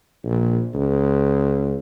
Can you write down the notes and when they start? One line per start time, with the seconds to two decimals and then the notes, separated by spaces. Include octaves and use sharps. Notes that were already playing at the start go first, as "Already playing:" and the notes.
0.24 A#1
0.74 C#2